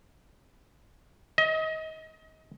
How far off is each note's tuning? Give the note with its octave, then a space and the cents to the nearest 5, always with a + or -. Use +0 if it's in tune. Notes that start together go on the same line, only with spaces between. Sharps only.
D#5 +30